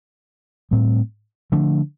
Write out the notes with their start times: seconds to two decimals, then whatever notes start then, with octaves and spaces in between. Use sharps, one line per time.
0.71 A2 G3 C4
1.52 D3 F3 A3 D4